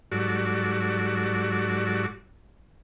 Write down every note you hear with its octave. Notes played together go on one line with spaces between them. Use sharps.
G#2 F#3 G3 F#4 A4 D5